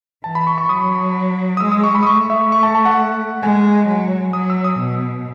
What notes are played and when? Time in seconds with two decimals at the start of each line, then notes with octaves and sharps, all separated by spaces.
0.24 E3 A5
0.35 B5
0.47 C#6
0.58 C#6
0.69 F#3 D#6
1.57 D#6
1.60 G#3 E6
1.72 D#6
1.84 C#6
1.95 B5
2.03 D#6
2.06 A3 C#6
2.30 E5
2.52 C#6
2.63 A5
2.75 A5
2.85 F#5
3.42 G#3 G#5
3.88 F#3
4.33 F#3 D#6
4.50 E6
4.64 D#6
4.79 B2 D#6